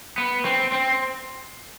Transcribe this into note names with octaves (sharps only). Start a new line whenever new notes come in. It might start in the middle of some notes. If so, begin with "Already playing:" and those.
B3
C4
C4